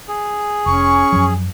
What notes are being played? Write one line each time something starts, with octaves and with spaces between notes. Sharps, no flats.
G#4
F1 C#4 C#6
F#2 F3 F#3